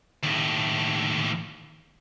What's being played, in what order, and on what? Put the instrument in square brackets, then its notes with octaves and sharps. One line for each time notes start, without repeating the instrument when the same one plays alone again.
[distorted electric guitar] D#2 A2